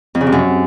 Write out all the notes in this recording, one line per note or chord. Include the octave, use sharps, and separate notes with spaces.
F2
C#3
C3
F#2